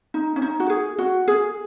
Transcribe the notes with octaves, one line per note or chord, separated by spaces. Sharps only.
D#4
C#4
D#4
F#4
G#4
F#4
G#4